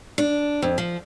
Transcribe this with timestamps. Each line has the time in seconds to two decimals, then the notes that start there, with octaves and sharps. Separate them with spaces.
0.18 D4
0.62 F2
0.78 F3